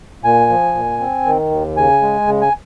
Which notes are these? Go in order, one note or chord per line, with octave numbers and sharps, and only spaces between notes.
A#2 G#5
F3
A#2
C4
D#3
D#2
C#3 G#5
G#3
C#3
G#5